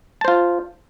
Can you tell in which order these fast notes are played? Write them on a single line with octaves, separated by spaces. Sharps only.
A5 C5 F4